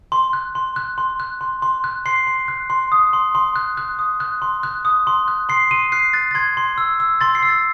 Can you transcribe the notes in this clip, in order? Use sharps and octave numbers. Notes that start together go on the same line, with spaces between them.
C6
F#6
C6
F#6
C6
F#6
C6
C6
F#6
C6 C7
C6
F#6
C6
D#6
C6
C6
F#6
F#6
D#6
F#6
C6
F#6
D#6
C6
F#6
C6 C7
C6 D#7
F#6 C7
F#6 A6
A6
C6 G#6
C6
E6
E6
C6 A6
C7
E6
A6